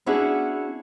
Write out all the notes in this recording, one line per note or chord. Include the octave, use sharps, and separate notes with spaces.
B3 C#4 D4 E4 F#4 G#4